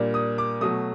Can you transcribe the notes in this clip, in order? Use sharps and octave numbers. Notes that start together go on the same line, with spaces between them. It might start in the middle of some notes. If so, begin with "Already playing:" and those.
Already playing: A#2 G3 A#3 D4
D#6
D6
B2 F#3 A3 D#6